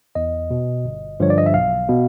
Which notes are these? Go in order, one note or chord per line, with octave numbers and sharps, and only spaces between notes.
E2 D#5
B2
G1
G2 D3 F3 C#5
D5
D#5
E5
B1 F5
B2